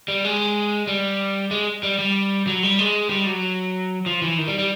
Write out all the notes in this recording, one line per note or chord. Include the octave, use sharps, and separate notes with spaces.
G3
G#3
G3
G#3
G3
G3
F#3
G3
G#3
G3
F#3
F3
E3
D#3
G3
G3